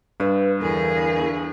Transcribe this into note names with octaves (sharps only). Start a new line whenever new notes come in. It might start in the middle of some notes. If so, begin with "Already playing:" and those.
G2 B4 D5 E5
E2 D3 G#4 A#4